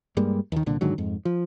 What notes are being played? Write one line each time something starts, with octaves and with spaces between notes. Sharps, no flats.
G2 G3 G#3 A#3
D#2 D#3
C2 A#2 D3
G#2 D3 D#3 F#3
F2 G#2
F3